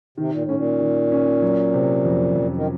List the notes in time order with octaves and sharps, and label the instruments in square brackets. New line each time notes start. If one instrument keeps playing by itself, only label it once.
[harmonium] C3 [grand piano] D#3
[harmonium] A#2
A2
[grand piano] C#4
[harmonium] A#2
[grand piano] D#3
C#4
F#3
C3
F2
F2
[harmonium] D#3